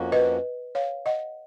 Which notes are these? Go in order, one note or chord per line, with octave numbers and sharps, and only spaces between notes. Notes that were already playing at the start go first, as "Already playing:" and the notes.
Already playing: F2 F3 A#3 C#4 F#4
B4 D#5
C#5 F5
D#5 F#5